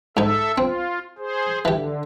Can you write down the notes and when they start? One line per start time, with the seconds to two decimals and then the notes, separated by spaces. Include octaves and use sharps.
0.17 G#2 D#4 A4 E5
0.58 C4 F4
1.18 G#4 C5
1.65 D3 E3 G4